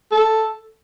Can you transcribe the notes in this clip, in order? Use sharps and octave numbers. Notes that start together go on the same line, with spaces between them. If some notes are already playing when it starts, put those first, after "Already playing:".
A4